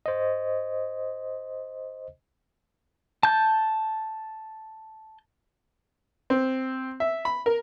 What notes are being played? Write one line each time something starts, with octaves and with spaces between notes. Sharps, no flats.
C5 D#5
A5 G6
C4
E5
B5
A#4